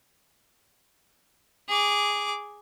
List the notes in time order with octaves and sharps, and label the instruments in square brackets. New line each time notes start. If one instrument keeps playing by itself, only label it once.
[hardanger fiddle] G#4 D6